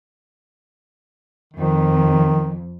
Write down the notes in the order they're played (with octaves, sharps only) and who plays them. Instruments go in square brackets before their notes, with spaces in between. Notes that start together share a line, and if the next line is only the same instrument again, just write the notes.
[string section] F2 [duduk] D#3